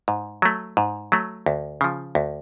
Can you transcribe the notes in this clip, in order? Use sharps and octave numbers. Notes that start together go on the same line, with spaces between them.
G#2
F#3 A3
G#2
F#3 A3
D2
C#3 F3
D2